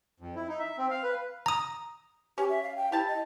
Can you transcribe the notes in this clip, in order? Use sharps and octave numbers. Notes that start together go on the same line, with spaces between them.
F2
E4
D#4
E5
C4
F5
B4
A#5 D#6
C#4 G4
E5
F5
G5
E4 G4 A5
D#5